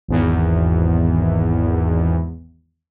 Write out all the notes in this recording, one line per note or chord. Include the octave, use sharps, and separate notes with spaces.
G#1 E2